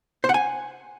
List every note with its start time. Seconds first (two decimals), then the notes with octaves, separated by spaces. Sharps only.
0.24 C5
0.29 F#5
0.34 G#5